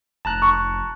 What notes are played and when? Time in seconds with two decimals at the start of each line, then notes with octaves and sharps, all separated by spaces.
0.25 F1 A5 A#5 F#6
0.42 C#6